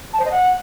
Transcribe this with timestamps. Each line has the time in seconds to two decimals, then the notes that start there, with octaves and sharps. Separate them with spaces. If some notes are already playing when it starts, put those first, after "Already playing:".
0.13 A5
0.19 C5
0.25 D#5
0.31 F#5